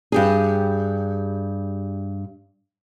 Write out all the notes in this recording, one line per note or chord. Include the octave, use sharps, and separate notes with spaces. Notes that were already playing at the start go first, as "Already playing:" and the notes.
G2 G4 G#4